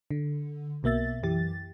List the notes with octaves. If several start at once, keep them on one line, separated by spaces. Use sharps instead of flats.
D3
B1 B2 A#3 E5 A6
F#2 E3 G4 A6